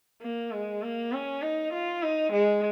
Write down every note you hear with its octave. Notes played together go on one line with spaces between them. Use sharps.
A#3
G#3
A#3
C#4
D#4
F4
D#4
G#3